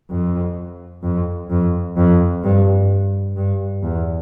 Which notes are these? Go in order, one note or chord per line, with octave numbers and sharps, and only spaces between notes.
F2
F2
F2
F2
G2
G2
E2